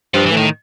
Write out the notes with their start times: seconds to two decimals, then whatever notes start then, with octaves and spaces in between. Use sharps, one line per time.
0.14 G2 F3
0.26 E3
0.32 A2
0.37 D#3